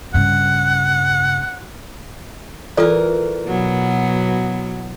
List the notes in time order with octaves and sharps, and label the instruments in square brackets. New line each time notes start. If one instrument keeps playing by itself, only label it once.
[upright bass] G2 C#3 [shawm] F#5
[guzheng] E3 A#4 [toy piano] F4 A4 D5
[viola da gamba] B2 F#3 B3